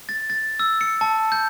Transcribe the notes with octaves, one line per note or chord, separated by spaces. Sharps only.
A6
A6
E6
C#7
A5
G6